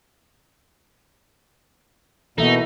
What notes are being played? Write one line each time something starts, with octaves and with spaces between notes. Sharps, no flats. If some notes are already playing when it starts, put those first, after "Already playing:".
B2 E3 A#3 B3 D#4 A4 E5